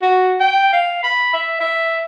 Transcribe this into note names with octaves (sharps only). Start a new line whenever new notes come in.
F#4
G5
F5
B5
E5
E5